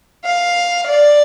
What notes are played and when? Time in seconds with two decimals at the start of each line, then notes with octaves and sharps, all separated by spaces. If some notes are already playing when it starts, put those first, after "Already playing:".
0.25 F5
0.88 D5